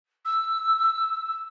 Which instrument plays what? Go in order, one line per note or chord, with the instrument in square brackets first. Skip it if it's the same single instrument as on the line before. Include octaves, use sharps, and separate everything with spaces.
[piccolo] E6